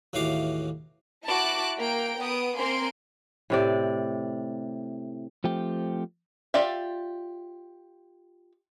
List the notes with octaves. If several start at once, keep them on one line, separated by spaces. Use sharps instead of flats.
D#2 A2 E3 F#4 F5 D6
E4 F#4 A5 D6 F#6
A#3 A#4 G5 D7
B3 D#6 D7
A#3 C4 A#4 G#5 C6 D7
A2 C3 D5
F3 A3 C4 G4
F4 G4 D5 E5